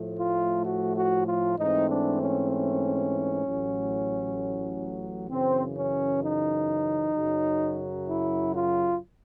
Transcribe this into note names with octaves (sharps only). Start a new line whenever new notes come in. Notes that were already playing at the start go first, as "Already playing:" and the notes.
Already playing: A2 F3 A3
F4
F#4
F#4
F4
G#2 E3 A3 C4 D#4
D4
C#4
C#4
A1 A2 F#3
F#2 C#3 E3 C4
C#4
D#4
F#2 C#3 F#3
E4
F4